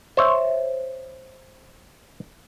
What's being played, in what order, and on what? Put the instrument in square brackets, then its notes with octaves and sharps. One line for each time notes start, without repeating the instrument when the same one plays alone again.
[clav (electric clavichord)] C5 C#5 E5